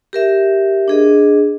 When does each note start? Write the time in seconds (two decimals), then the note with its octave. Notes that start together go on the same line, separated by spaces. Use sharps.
0.13 G4 A#4 E5
0.88 D4 G#4 D#5